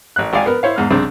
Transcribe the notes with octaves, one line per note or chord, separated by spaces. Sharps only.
A1 F#6
G#1 D5 F5 G#5
B3 A#4
E4 C5 C#5 F5
E2 G#2 F6
C2 C#3 C4 D4